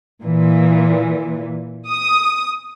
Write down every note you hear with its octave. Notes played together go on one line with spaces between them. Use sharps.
A#2 E3
D#6